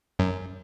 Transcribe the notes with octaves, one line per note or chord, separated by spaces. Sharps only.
F#2